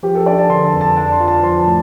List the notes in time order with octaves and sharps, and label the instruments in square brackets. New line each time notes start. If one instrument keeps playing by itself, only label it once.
[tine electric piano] F3 [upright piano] G4
[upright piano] A4
[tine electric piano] D4 [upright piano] D5
[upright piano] A5
[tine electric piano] D3 [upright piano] C6
[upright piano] A5
[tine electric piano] F2
[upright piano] A5
[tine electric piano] D4 [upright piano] A5
[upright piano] C6
[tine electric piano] F4
[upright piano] A5
[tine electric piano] F3 [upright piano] C6
[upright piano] A5
[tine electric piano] A2